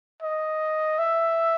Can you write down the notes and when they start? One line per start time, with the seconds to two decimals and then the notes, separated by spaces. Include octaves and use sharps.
0.23 D#5
0.99 E5